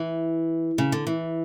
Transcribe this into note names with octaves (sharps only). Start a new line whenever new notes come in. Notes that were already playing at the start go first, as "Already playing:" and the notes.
Already playing: E3
C#3
D3
E3